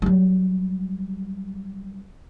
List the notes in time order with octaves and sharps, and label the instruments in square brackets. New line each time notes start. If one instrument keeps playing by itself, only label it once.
[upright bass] F#3 G3